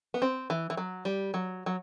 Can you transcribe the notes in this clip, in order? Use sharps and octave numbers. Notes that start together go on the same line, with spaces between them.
B3
C4
E3
E3
F#3
G3
F#3
F#3